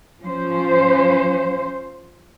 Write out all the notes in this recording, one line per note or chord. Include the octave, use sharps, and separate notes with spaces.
F3 C#4 C5